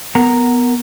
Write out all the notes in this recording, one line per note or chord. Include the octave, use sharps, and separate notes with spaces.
B3 A#4 F#5 A#5